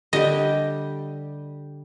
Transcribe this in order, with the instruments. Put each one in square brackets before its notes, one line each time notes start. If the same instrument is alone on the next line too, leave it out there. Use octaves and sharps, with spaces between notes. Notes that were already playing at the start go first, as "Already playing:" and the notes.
[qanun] D3 G3 G4 [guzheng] D#5